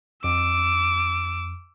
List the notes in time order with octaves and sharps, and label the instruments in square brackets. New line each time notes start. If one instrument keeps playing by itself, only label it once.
[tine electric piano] F2 [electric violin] D6 E6